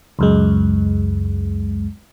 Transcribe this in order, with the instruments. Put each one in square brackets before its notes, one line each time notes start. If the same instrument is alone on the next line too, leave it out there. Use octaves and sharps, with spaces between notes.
[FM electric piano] C#2 F#2 G#3